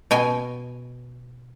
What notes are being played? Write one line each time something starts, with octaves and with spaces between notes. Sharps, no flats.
B2 G5 G#5